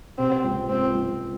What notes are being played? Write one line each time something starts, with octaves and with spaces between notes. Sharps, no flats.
C3 C4
C#2
C#2 C4
C#2